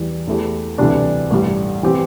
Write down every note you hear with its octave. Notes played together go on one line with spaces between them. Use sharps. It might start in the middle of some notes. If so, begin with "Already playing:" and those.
Already playing: E2 E3 G3
E2 E3 A3 E4 G4
D2 C3 E3 G3 D4
A1 G2 G3
E3 C4 G4